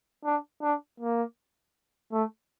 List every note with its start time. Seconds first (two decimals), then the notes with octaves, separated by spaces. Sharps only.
0.25 D4
0.62 D4
1.00 A#3
2.12 A3